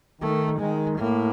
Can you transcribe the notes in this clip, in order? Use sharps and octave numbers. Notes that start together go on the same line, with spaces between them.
D#3 A3
D#3 G#3
A2 A#3